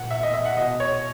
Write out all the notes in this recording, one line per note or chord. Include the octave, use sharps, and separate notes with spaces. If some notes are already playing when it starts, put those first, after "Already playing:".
Already playing: A#2 F#5
E5
D#5
E5
F#5
B2 D#5
C#5